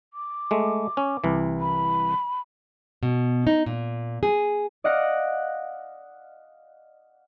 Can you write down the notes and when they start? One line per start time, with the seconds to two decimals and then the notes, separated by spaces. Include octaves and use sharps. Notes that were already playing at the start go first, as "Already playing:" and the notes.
0.14 D6
0.51 G#3 A3
0.97 C#4
1.24 C2 E3
1.60 B5
3.03 B2
3.47 D#4
3.66 A#2
4.23 G#4
4.84 D5 D#5 F5 F#5 A#6 C#7